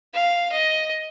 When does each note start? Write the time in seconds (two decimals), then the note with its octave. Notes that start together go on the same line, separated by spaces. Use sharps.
0.14 F5
0.52 D#5